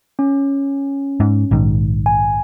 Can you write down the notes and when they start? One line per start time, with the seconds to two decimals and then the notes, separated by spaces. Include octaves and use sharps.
0.19 C#4
1.20 G#2
1.51 A#1 G#2 D#3
2.06 G#5